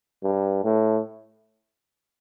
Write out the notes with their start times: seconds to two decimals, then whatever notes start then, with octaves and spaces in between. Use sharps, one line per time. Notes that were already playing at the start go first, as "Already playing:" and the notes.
0.23 G2
0.64 A2